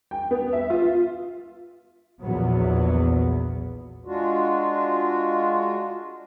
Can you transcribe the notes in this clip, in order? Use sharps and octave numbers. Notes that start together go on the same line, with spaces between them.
G5
B3
E5
F4
A#1 E2 F#3 B3
G#3 D4 F4 F#4